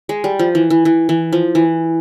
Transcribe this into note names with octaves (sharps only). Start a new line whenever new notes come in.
G#3
G3
F3
E3
E3
E3
E3
F3
E3